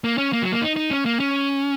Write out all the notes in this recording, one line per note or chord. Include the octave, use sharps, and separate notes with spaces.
A#3
C#4
A#3
F#3
A#3
D#4
D#4
C#4
A#3
C#4